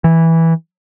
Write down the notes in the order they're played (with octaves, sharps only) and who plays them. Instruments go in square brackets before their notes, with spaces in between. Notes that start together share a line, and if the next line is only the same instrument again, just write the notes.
[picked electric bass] E3